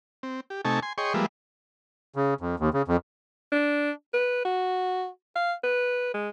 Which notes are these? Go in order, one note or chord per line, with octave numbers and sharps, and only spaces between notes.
C4
G4
C3 A3 D#4 G#5 A5 C#6
G#5 C6
G#4 C#5 D#5 G5 C6 C#6
F3 G3 G#3 A#3 B4 E5
C#3
F2
D#2
C#3
F2
D4
B4
F#4
F5
B4
G#3